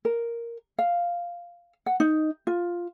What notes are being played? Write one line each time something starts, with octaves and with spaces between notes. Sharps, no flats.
A#4
F5
F#5
D#4
F4